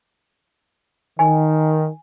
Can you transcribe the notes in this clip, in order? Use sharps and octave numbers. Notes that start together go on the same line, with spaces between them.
D#3 G#5